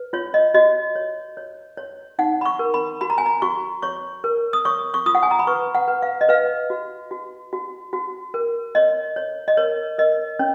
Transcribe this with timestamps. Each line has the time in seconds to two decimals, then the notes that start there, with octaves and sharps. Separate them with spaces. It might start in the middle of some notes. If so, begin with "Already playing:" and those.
Already playing: B4
0.13 F4 C#5
0.34 D#5
0.54 F#4 D#5
0.96 C#5
1.37 C#5
1.77 C#5
2.19 D#4 F#5
2.41 B5
2.46 C#6
2.59 A#4
2.74 B5
3.01 F#4 B5
3.10 A#5
3.18 G#5
3.26 A#5
3.42 F#4 C#6
3.82 C#5 C#6
4.24 A#4
4.53 D#6
4.65 C#5 C#6
4.94 C#6
5.06 F4 D#6
5.15 F#5
5.23 G#5
5.31 A#5
5.39 B5
5.47 B4 C#6
5.75 F#5
5.88 B4
6.02 F5
6.21 D#5
6.29 B4 F5
6.70 F#4
7.11 F#4
7.53 F#4
7.93 F#4
8.34 A#4
8.75 C#5 D#5
9.16 C#5
9.48 D#5
9.57 A#4 C#5
9.98 A#4 D#5
10.39 C#4 C#5